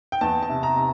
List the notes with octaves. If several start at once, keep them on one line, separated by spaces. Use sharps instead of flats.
G5
E2 A5
A5
C3
A#5
C3